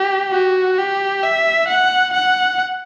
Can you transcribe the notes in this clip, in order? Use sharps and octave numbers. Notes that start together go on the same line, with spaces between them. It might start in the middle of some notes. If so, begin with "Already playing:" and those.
Already playing: G4
F#4
G4
E5
F#5
F#5